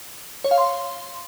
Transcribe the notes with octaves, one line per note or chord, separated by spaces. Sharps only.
C#5
F5
C6